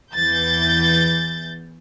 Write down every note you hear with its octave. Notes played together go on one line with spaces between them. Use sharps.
E2 E3 G6 A6